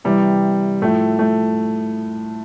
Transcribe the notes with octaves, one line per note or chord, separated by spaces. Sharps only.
C3 E3 G3
A2 F3 A3
A3